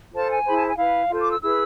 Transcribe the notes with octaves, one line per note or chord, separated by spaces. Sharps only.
F4 A4 C5 A5
G#5
E4 G#4 C5 B5
A5
G#5
E4 B4 F5
F4 A4 C5
D6
E6
E4 G#4 B4 E6